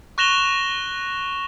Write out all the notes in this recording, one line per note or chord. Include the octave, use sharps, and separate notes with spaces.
C#6 F#6 A#6 E7 F7 G7